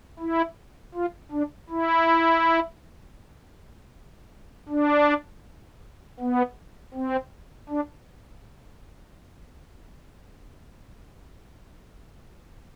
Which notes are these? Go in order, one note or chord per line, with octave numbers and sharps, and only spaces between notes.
E4
F4
D4
E4
D4
B3
C4
D4